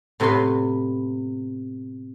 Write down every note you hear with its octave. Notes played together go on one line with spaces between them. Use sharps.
A2 C3 B3 B4 C6